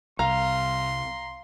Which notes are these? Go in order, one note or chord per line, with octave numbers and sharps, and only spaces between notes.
C2 F5 A#5 C6